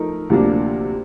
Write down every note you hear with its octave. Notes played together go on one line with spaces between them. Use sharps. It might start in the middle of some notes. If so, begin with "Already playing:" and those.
Already playing: F3 A3 D#4 A#4
D2 C3 F3 A#3 D4